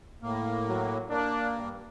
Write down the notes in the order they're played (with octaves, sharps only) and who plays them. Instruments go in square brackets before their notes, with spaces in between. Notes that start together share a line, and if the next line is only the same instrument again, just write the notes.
[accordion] A2 A#3
[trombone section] F#3
[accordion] A#3 [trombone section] D4
[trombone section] G2